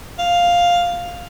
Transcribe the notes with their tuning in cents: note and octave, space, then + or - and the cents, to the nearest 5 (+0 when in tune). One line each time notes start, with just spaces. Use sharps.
F5 +5